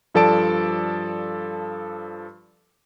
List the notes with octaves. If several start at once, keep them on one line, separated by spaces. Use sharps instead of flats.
G2 F3 A4 D5 A5 D7